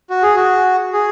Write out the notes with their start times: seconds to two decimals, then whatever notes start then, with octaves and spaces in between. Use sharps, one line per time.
0.10 F#4
0.23 G#4
0.36 F#4
0.93 G#4